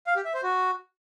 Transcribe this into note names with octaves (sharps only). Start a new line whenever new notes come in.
F5
G4
E5
C5
F#4